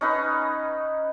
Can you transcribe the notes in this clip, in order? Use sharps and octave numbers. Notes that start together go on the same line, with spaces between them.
C#4 D#4 B4